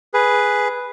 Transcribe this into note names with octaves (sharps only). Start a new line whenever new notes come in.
G#4 B4